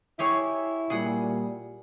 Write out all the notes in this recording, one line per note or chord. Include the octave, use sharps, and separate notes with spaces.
E4 G4 G#4 C#5
A#2 G3 G#4 F#5